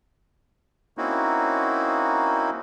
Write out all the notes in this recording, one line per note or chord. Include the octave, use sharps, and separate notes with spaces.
A#3 C4 C#4 D#4 E4 F#4